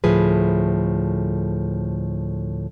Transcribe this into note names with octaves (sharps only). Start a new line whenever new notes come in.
D2 A2 F3 G#4 B4